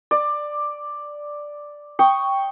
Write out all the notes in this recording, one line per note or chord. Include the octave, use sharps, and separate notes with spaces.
D5
G5 C#6 D#6